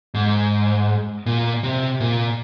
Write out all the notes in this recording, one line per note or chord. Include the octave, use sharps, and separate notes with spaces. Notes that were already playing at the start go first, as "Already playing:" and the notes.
G#2
A#2
C3
A#2